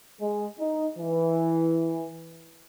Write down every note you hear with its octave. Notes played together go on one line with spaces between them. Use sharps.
G#3
D#4
E3